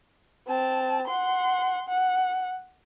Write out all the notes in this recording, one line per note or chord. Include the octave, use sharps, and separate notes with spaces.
C4 A5
F#5 C6
F#5